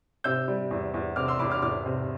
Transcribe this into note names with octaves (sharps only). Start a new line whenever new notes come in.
C3 E6 G6
G3
E2
E2
C3 D6 F6
C6 E6
E2 B5 D6
D6 F6
E2 D6 F6
C3